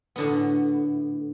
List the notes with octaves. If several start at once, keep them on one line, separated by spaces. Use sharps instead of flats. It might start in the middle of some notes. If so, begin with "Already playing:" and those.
A2 D3 B3